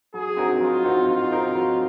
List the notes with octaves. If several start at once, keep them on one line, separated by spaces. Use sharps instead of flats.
F#3 G#4
C4 D#4 F#4 A#4
F#3 F4
C4 D#4 F#4 A#4
F#3 F4
C4 D#4 F#4 A#4
F#3